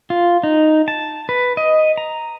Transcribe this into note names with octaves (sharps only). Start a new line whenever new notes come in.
F4
D#4
A5
B4
D#5
A#5